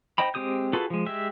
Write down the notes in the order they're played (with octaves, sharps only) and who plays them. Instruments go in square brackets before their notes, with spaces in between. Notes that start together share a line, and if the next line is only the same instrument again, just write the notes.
[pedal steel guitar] D#4 C5 D#5 G5 B5
G#3 C4 G4 D#6 G6
F4 F#4 G#4 A4 B4
F3 G#3
G#3 G4 E5